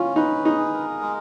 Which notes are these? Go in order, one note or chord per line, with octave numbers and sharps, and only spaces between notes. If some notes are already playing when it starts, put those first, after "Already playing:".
Already playing: C#4 F4
D#4 B4
D#4 G#4
A#4
G#3